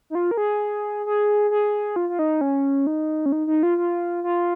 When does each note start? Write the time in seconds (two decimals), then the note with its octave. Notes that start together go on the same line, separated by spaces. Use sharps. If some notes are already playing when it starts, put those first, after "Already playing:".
0.10 D#4
0.15 F4
0.31 A#4
0.37 G#4
1.06 G#4
1.51 G#4
1.96 F4
2.09 F4
2.19 D#4
2.41 C#4
2.87 D#4
3.26 C#4
3.32 D#4
3.47 D#4
3.63 F4
3.78 F4
4.24 F4